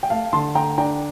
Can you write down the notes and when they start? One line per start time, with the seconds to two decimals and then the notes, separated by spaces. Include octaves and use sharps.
0.03 G5
0.10 A3 F5 A5
0.33 D3 A5 C6
0.55 D3 G5 A#5
0.78 D4 G5 A#5